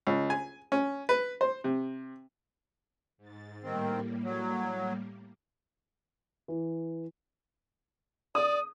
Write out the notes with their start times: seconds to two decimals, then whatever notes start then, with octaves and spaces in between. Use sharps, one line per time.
0.07 C#2
0.30 G#5
0.72 C#4
1.09 B4
1.41 C5
1.64 C3
3.18 G#2 A6
3.63 A2 D#3 G3 A#3 C4
4.24 F#3
6.48 E3
8.35 D5 D#6